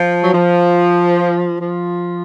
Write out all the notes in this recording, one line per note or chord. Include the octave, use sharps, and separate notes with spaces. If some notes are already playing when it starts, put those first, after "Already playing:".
Already playing: F3
F#3
F3
F3